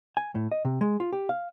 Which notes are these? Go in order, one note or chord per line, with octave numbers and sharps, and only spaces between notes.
G#5
A2
D#5
C3
G#3
F4
G4
F5